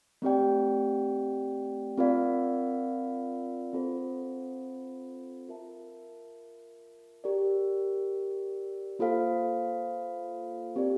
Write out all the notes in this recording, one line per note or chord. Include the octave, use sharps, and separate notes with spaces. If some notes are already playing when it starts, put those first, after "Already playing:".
A3 C4 G4 D5 G5
C4 F4 A#4 D5 F5
C4 F4 A4 C5
F4 A#4 E5 A5
G4 A#4 D5
A#3 F4 A4 C5 F5
C4 G4 A#4 D5